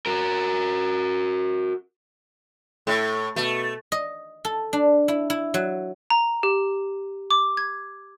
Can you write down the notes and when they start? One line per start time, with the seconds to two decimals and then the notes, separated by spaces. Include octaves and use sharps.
0.06 F#4 A#4
2.87 A2 A3
3.36 B2 A3
3.92 D#5
4.45 A4
4.73 D4
5.08 E4
5.30 E4
5.54 F#3
6.10 A#5
6.43 G4
7.31 D6
7.57 G#6